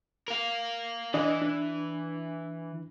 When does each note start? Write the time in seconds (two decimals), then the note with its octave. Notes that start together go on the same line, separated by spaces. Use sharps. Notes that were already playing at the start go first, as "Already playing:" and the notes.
0.28 A#4 F5
1.14 E3 D4 D5 D#5
1.42 D4